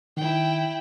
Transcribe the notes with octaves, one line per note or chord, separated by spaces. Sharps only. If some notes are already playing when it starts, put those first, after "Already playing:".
D#3 E4 G5